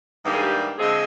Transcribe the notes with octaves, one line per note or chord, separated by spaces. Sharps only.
G#2 E3 G3 A#3 D4 G4
G#4
G4
D3 F3 G#3 C4 G#4